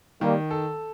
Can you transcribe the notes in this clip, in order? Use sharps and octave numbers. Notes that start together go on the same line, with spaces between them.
D#3 G3 A#3
A4